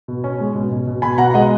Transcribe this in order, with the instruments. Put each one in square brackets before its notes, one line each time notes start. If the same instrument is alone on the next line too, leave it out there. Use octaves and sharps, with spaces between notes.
[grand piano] B2
C#4
G#3
B2
B2
B2
B2 G#5 B5
B2 F#5 A#5
G#3 D#5 F#5